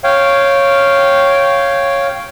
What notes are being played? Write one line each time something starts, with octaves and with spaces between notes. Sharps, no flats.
C#5 F5 G5